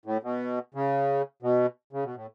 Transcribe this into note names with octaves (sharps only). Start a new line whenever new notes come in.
A2
B2
C#3
B2
C#3
B2
A2